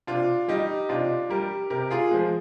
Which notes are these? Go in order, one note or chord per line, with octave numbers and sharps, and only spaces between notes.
C3 D4 F4
G3 D#4 G4
C3 D4 F4
G3 G4 A#4
C3 G4 A#4
F4 G#4
F3 G#3